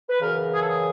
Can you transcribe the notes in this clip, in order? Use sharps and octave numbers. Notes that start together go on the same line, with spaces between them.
B4
F#2 C#3 E3 A#4
G#4
A4
G#4